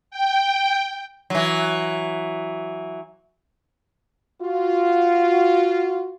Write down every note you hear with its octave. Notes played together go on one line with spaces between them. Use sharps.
G5
E3 F#3
F4 F#4